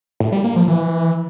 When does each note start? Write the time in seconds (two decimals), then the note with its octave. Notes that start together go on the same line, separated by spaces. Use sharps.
0.20 A2
0.32 G3
0.44 A#3
0.56 F3
0.68 E3